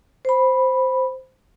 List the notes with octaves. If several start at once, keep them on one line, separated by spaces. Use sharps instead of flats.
C5 B5